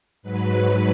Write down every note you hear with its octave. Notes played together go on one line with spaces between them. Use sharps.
G#2 F#3 B4